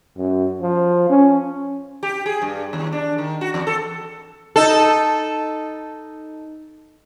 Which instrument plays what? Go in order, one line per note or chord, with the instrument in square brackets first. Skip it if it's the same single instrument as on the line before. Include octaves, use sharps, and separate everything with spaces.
[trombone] F#2
F3
C#4
[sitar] G4
G#4
G2
D#2
D4
D#3
F#4
E2
A4
D#4 A4